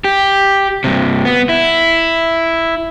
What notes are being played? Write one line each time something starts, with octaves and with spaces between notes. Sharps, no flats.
G4
G2 C3
B3
E4